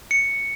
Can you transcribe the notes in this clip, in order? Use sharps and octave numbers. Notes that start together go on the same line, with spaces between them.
C#7